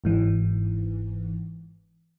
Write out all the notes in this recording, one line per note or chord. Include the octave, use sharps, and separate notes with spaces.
G1 G#2 E3